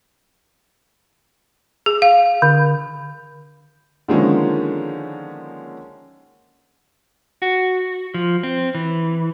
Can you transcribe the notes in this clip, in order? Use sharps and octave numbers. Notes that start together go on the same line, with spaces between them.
G#4
F5
D3
D3 D#3 F3 G#3 A#3 C#4
F#4
F3
C4
E3